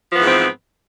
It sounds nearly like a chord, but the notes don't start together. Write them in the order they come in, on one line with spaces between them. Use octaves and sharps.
F3 B3 E3 G#2 C4